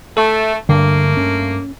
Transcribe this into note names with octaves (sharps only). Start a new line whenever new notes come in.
A3 A4
G2 D3 A3 A#3
C#4